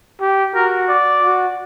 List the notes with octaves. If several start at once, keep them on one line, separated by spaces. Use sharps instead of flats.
G4
F#4 A#4
D5
F#4